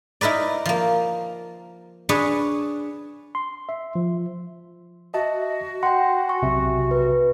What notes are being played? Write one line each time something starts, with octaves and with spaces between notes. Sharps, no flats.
D#4 E4 A#4 B4 D5
F3 A#3
D4 G#4 B4 C#5
C6
E5
F3
F#4 D#5 E5 A5
F#5 G5 C6
G#5 C#6
B1 C3 E5
B4